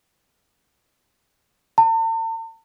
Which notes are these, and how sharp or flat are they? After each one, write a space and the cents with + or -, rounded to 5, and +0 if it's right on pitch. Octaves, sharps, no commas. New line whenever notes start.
A5 +45